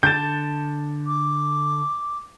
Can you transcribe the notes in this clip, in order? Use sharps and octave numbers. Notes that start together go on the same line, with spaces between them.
D3 A5 G6 A6
D6